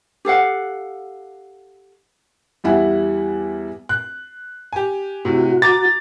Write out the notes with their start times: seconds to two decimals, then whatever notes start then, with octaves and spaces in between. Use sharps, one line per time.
0.25 G4 A4 F5 F#5
2.64 E2 G3 E4 F#5 G#5
3.89 F#6
4.73 G4 G#5
5.25 A2 C3 F#4
5.62 A#5 D6 A6